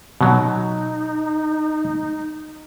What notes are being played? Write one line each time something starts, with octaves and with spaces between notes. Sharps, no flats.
B2 F#3 D#4